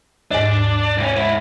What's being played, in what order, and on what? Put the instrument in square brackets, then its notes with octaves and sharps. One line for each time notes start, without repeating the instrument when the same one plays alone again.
[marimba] D#2 G#2 [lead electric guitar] D4
[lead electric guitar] C2 C#4
G#2 E4